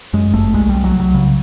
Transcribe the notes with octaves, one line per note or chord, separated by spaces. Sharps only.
F#2 G#3
G1 A3
C2 G#3
C2 G3
F#3
C2
F#3
C#3